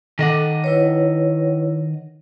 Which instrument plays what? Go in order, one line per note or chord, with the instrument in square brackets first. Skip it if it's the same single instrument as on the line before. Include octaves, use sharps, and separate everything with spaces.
[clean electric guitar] D#3 D#5 F#5 [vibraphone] A4 D6
[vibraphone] E4 B4 C#5